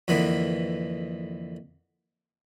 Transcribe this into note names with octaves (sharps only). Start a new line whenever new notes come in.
F2 D3 E3 A#3 B3